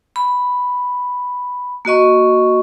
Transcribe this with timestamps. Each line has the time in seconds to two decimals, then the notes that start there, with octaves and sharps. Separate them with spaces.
0.16 B5
1.85 A#3 F#4 D#5 C#6